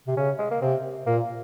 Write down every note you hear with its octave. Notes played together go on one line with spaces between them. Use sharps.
C3
C#3 C#4
G#3
A#3
C3 C4
A#2 A#3